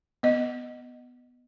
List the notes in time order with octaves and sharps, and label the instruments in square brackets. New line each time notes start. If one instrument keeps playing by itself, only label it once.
[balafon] B3 D#5